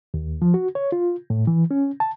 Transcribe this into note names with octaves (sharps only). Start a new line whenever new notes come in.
D#2
F3
F#4
C#5
F4
A2
E3
C#4
A5